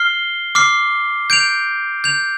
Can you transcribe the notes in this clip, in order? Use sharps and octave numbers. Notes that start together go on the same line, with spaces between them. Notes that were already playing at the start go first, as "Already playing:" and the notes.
Already playing: F6 C7 G7
D6 F6 C7
G6 D7 F7
G6 F7